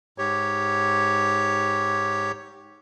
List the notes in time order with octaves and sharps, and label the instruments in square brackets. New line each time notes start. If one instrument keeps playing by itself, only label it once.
[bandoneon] G#2 G4 C#5